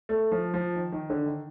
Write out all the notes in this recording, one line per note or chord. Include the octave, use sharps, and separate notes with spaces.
A3
F3
F3
D#3
D#3
D3
D#3